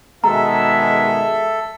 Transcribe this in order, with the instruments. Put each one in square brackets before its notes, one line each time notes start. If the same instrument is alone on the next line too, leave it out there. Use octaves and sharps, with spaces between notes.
[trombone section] B2 D#3 G#3 [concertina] A4 [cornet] E5 [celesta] A#5